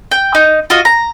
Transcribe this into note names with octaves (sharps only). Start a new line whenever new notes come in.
G5
D#4
F4 F#4 D#5
A#5